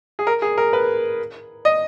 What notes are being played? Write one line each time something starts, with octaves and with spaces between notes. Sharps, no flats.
G#4
A#4
G#4
A#4
B4
D#5